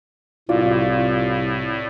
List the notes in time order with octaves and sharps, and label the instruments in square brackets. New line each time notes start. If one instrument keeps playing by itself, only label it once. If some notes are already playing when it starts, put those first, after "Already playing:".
[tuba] C2 [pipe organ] A2 [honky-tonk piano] F4 F#4 [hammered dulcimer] D5